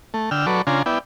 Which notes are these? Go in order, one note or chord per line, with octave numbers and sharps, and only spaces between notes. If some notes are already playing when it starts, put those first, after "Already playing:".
A3
D3 G5 E6 F6
F#3 A4 B4 D5 C#6
C#3 D4 F4 G#5 A#5 C6
B3 E4 D5 G5